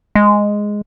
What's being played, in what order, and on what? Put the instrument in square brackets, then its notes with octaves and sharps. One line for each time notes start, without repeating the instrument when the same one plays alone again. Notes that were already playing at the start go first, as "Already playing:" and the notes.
[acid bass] G#3